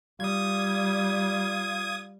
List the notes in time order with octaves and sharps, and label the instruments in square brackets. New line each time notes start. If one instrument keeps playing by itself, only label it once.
[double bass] G3 [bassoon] F4 [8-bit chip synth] D#6 G#6